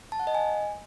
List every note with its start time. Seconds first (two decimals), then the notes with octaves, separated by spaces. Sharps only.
0.12 A5
0.20 F#5
0.27 D#5
0.35 G#5